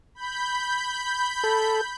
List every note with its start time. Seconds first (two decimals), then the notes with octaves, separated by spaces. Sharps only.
0.15 B5 G6
1.44 A4